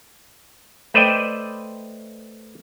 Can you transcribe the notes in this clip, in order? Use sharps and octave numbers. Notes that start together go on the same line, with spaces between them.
A3 B4 C5 D5 D#5 G5